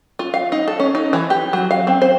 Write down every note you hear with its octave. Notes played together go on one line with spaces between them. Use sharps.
F4
F5
D#4
A4
C#4
D#4
E3
G4
F#3
F5
C4
C5